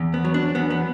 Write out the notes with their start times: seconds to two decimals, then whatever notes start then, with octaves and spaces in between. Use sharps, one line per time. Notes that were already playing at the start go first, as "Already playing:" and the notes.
Already playing: E2
0.14 B3
0.25 F#3
0.34 D4
0.55 E2 B3
0.70 B3